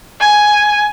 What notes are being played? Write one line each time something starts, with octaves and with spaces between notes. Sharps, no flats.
G#5